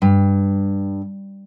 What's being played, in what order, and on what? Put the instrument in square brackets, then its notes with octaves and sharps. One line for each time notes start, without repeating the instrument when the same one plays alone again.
[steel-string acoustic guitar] G2